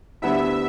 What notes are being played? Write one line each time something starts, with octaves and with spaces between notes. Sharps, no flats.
D2 D3 G3 B3 E4 E5